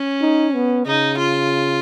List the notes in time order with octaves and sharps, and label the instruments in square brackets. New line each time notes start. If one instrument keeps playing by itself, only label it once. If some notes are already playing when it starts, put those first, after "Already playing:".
Already playing: [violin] C#4
[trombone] D#4
B3
[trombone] C#3 [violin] D#4
[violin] F4